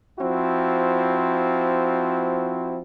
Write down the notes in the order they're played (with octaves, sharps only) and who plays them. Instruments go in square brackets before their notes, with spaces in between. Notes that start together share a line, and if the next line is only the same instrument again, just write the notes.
[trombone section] F3 C4 E4 F#4